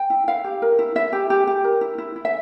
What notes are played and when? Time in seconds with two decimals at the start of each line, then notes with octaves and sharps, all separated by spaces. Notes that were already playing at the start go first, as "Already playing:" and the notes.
Already playing: G5
0.10 E4
0.28 E4 F5
0.44 G4
0.62 A#4
0.79 E4
0.95 E4 E5
1.13 G4
1.30 G4
1.47 G4
1.64 A#4
1.81 E4
1.98 E4
2.16 E4
2.25 E5